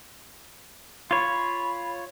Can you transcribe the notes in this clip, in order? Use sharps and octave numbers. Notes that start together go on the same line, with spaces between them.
F4 C#5 B5